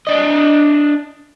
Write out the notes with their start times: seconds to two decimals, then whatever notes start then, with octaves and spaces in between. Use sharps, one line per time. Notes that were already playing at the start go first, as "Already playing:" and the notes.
0.07 D4 D#5